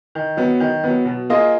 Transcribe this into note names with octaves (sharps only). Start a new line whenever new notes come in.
D#3
F#3 B3
D#3
F#3 B3
B2
A#3 F4 G#4 D#5